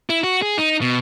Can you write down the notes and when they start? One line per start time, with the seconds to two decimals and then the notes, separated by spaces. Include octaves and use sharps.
0.10 E4
0.24 F#4
0.42 G#4
0.58 D#4
0.81 B2